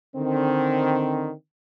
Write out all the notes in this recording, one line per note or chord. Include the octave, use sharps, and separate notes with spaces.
D3 D#3 C4